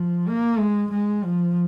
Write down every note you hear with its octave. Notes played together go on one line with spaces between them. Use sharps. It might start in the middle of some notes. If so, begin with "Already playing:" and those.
Already playing: F3
A#3
G#3
G#3
F3